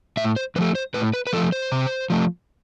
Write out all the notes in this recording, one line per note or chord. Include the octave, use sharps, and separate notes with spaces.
A2 E5
C5
F3 A3 B4
C5
A2 B4
B4
B4
F3 A3 A4
C5
C3
F3 A3